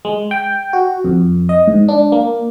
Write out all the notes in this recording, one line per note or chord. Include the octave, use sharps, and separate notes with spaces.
G#3
G5
F#4
F2
D#5
G#2
D4
A#3